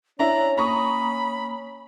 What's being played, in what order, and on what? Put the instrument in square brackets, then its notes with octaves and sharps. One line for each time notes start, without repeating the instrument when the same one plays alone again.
[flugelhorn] C#4 [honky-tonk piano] D4 E4 [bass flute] C#5 [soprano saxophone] A#5
[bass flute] A#3 [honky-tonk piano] A#5 C#6 D#6 [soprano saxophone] B5